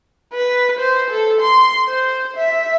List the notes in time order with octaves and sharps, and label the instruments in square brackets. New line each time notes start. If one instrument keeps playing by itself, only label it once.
[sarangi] B4
C5
A4
C6
C5
E5